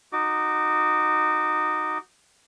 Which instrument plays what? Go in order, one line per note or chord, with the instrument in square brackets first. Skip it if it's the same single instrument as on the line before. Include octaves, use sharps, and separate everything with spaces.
[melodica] D#4 F#4 D6